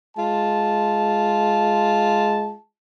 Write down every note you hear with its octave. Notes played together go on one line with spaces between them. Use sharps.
G#3 F4 A5